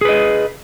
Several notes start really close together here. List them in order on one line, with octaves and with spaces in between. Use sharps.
G#4 B4 D#5